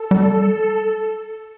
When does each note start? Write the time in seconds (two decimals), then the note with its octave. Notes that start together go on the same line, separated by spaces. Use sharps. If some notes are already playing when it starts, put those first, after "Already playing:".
Already playing: A4
0.11 G3